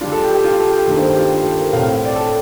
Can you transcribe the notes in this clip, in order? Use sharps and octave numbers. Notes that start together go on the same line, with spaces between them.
D3 G3 D4 F4
A4
G4
G4
F4
A4
G4
G2 D#3 G3 A#3 D4 A4
C5
G4
F4
G4
A4
A#4
A2 A3 C4 F5
F5
F5
D5
A4